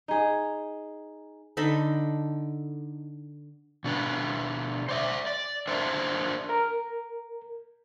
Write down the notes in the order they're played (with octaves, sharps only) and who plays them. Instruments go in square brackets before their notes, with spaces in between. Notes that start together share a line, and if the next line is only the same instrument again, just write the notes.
[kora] D#4 G#4
[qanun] D3 D#4 A4 B5
[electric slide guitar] B2 D4 B4
C5 D5 E5
D5
D4 A#4 C5 E5
[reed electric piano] A#4